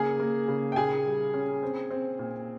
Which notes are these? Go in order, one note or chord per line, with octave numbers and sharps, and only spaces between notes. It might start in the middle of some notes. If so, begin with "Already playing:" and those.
Already playing: C#3 A#3 G#4 G#5
A#3
C#3
G5
A#2 G#4 G#5
G3
C#4
C4
C4
A#2